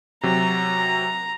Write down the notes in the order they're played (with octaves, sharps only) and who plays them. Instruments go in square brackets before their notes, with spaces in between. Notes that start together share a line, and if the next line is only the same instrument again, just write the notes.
[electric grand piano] C3 F#3 [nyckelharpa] A#5